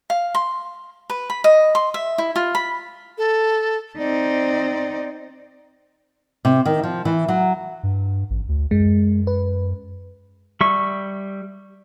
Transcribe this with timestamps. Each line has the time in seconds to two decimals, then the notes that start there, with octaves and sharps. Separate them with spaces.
0.10 F5
0.35 C6
1.10 B4
1.30 B5
1.44 D#5
1.75 C6
1.94 E5
2.18 E4
2.36 F4
2.55 B5
3.18 A4
3.98 C4 D#4 D5
6.45 C3
6.65 D#3
6.83 F3
7.05 E3
7.28 F#3
7.83 G2
8.30 A1
8.48 D2
8.71 F#2 G#3
9.27 B4
10.61 G3 E5 C#6